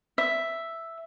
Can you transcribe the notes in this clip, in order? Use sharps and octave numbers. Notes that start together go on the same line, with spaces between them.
E5